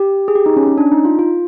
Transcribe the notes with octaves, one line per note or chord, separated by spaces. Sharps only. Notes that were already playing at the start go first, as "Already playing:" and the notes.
Already playing: G4
G#4
G4
D#4
C#4
C#4
D4
D#4
F4
F4